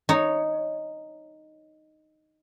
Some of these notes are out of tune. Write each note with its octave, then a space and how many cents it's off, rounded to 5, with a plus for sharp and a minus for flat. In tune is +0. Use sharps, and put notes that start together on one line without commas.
D#4 -5 C#5 +0